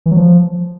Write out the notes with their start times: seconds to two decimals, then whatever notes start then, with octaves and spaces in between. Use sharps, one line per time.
0.06 E3
0.11 F#3
0.17 F3